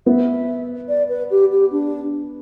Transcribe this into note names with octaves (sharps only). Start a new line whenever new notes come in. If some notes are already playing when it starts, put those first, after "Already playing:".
B3 E5
D5
B4
G4
G4
D4